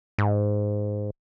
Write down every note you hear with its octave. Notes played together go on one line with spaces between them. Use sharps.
G#2